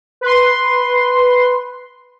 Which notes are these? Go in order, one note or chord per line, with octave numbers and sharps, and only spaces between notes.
B4 C6